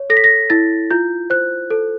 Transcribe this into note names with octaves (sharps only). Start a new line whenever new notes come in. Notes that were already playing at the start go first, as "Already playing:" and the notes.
Already playing: C#5
A4 A#6
B6
A#6
E4 A6
F4 G6
C5 F#6
A4